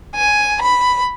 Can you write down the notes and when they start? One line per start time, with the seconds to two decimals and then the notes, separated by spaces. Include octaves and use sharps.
0.16 G#5
0.61 B5